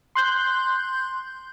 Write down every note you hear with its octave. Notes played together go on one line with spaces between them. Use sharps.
C6 F#6 G6